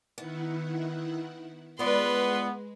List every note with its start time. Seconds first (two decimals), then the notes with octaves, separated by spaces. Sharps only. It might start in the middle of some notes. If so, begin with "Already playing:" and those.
0.18 D#3 B3 E4 F#5
1.79 G#3 B3 F4 B4 D5 C6